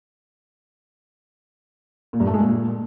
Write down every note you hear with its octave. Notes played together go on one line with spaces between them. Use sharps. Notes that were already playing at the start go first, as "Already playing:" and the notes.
A#2
G2
A3
G#3
A#2